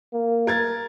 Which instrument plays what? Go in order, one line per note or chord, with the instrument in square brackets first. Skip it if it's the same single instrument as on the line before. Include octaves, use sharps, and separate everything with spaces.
[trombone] A#3
[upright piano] A#4 G#6 A6